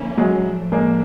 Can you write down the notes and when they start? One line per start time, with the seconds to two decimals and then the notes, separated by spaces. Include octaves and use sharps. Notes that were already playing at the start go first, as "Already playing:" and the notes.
Already playing: D3 F3 A#3 C#4 E4
0.17 F#3 G#3
0.44 A2 F3 A3 D4
0.72 G#3 A#3